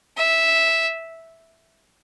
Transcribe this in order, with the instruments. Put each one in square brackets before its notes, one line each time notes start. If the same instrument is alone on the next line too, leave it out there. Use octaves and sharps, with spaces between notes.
[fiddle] E5